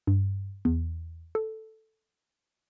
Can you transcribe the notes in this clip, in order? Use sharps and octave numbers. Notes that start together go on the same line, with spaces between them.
G2
E2
A4